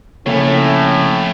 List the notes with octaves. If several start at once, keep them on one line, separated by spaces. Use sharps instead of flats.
F2 A2 C#3 A3 A#3 C#4 C#5